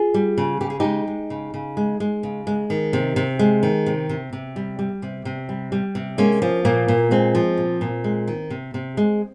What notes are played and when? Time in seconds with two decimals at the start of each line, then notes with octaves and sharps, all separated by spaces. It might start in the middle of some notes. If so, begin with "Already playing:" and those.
Already playing: F4 G#4
0.14 G3
0.38 C#3
0.61 C#3 G4
0.70 G#4
0.80 G#3 D#4 G4
1.07 G#3
1.30 C#3
1.54 C#3
1.77 G#3
2.00 G#3
2.23 C#3
2.47 G#3
2.70 D#3
2.93 C3
3.16 C3
3.39 G#3
3.63 D#3
3.86 C3
4.09 C3
4.33 C3
4.56 G3
4.79 G3
5.02 C3
5.25 C3
5.49 G3
5.72 G3
5.95 C3
6.18 G#3 A#3 C#4
6.42 F3
6.65 A#2 A#3
6.88 A#2
7.11 G#3 C4
7.35 F3
7.58 A#2
7.81 A#2
8.04 G#3
8.27 D#3
8.50 C3
8.74 C3
8.97 G#3